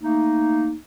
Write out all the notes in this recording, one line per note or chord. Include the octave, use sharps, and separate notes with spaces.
A3 A#3 D#4